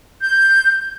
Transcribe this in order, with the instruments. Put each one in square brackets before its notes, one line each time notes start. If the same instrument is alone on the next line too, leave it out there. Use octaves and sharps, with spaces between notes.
[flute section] G6